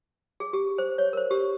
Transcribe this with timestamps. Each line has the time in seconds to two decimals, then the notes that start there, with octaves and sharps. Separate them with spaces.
0.40 G#4
0.53 G4
0.78 C5
0.98 C#5
1.13 A#4
1.17 C5
1.31 G4